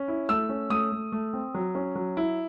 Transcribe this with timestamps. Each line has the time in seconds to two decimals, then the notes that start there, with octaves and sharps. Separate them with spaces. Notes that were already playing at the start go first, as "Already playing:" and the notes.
Already playing: C#4
0.08 E4
0.29 A3 E6
0.49 C#4
0.70 A3 D#6
0.92 A3
1.12 A3
1.33 C4
1.54 F#3
1.75 C#4
1.95 F#3
2.17 E4